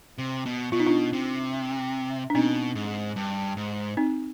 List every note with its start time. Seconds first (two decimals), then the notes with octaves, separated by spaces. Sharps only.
0.18 C3
0.46 B2
0.72 B2 F4
0.80 D#4
0.86 D4 F4
1.13 C3
2.30 D4
2.35 B2 C4 D#4
2.75 G#2
3.16 G2
3.57 G#2
3.97 C4 D#4